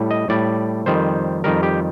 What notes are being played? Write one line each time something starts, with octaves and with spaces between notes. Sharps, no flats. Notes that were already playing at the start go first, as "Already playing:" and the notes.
Already playing: A2 G3
D#5
A2 G3 D5
F2 D#3 G3 C5
F2 D#3 G3 A#4
G4